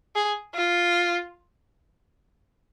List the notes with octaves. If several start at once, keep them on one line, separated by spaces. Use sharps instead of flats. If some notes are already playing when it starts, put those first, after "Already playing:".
G#4
F4